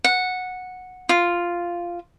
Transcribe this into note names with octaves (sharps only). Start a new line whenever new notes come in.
F#5
F4